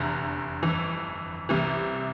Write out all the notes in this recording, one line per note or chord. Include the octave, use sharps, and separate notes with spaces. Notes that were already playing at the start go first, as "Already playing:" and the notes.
Already playing: F1 E2 D3 A#5
G1 F2 E3
C2 C3 E3